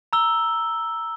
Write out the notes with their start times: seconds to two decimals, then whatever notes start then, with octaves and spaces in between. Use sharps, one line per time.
0.13 A#5 E6 G7